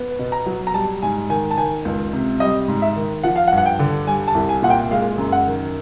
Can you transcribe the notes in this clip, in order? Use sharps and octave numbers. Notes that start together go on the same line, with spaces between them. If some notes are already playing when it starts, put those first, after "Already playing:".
Already playing: B3
B2
A#5
F#3
A#5
G3 A5
G#2 G#5
D#3 G#5
A5
D#3 G#5
C#2
C3
G3 D#5
G#2
E5
D#3
F3 F#5
F5
F#5
G2
F#5
G5
D3
G3 G#5
A5
C2
G#5
A#2 F#5
G5
G#3 F5
F#2
F#5
D#3